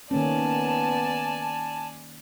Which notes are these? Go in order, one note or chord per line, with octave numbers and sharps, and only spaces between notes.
D#3 A#3 B3 C#4 D5 G#5 A5